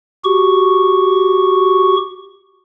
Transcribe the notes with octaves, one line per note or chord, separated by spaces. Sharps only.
F#4 G4 C#6